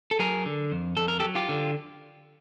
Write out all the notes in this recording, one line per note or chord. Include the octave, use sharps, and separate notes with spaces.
A4
F#3 G#4 A#4
D3
F2
F2 A4
A#4
G4 A4
F#3
F4 G4
D3